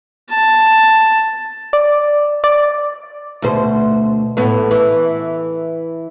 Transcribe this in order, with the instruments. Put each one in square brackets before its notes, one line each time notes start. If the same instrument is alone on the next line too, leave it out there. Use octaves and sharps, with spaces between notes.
[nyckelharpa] A5
[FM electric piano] D5
D5
[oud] D2 B2 C5
A2 B3
E3